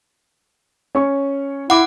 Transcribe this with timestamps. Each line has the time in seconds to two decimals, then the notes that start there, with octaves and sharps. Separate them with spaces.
0.95 C#4 C#5 C#6
1.70 E4 F#5 D6